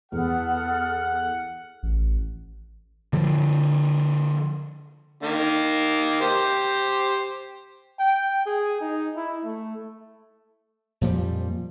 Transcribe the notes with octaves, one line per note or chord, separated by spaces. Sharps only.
E2 B3 A4 F#5 F6
A1
D3 F3
D#3 A#3
G4 C5
G5
G#4
D#4
E4
A3
F2 A#2 F3 G3